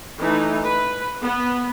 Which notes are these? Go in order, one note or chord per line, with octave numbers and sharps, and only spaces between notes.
E3 A3 D#4
B4
B3